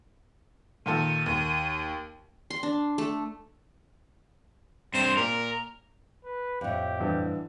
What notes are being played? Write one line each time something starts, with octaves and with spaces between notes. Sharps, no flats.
A#2 D#3 A4 D#7
D#2
C6
D4
A3
G2 C4 C5
A#2 A#4
B4
F2 A2 G4
G2 D3 E3